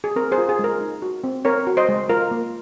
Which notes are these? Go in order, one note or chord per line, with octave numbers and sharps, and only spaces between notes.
G#4
C4 A#4
G#4 C5
F4
G#4
G#3 A#4
D#4
F#4
C4
C4 A#4 C#5
F#4
C5 D#5
G#3
F4 A#4
A#3